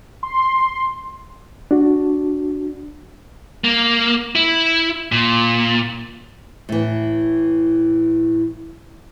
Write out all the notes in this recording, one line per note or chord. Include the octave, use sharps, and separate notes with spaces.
C6
D4 F#4
A#3
E4
A#2
A2 E3